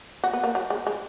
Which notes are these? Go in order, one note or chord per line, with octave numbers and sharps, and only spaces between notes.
F#4
B3
A#3
F#3
G#3
G#3